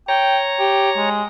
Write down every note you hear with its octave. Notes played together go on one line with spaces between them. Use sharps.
C#5 G5 A#5
G4
G#3